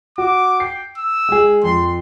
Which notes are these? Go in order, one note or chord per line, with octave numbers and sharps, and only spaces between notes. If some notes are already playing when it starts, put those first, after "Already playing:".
F#4 D6
G5 C7
E6
G#3 G#4
F2 C6